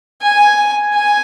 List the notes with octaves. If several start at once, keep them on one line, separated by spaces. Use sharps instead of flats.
G#5
G#5